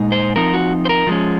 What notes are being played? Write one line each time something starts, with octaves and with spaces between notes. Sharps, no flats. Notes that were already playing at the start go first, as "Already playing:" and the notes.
Already playing: A#2 G#3 D#4
C5
F3 C4 D#4 A#4
F#4
C5
A#4
F3 G#3 C#4